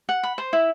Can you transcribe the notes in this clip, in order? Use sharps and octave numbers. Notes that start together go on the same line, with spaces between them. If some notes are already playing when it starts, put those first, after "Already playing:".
F#5
B5
C5
E4